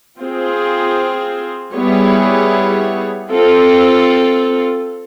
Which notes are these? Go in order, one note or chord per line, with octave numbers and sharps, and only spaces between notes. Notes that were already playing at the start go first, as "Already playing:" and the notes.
C4 F4 G#4 C5
G3 B3 E4 G#4 C#5
C4 F4 A4